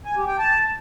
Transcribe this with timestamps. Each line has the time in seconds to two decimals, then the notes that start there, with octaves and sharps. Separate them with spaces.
0.05 G#5
0.16 G4
0.28 G5
0.39 A5